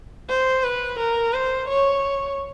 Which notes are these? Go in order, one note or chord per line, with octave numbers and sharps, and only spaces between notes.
C5
B4
A#4
C5
C#5